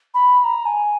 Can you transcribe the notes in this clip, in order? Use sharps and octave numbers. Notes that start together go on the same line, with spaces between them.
B5
B5
A#5
G#5